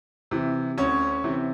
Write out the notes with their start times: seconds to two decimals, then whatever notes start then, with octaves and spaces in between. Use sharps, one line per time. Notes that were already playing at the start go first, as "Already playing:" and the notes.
0.31 C3 E3
0.78 D2 C#4 C#5
1.24 C3 E3